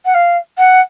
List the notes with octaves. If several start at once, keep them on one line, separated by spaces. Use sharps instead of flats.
F#5
F5
F#5